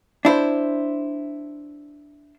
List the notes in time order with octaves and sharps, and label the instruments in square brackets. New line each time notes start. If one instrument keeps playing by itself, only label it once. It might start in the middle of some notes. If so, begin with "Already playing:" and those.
[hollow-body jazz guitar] D4 E4 C5